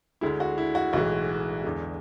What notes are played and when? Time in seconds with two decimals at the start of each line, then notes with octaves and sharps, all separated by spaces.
0.21 D2 D3 G#3 E4
0.40 F#4
0.58 E4
0.75 F#4
0.93 B1 A2 E3 G#3 F#4
1.64 E2 D3 G#3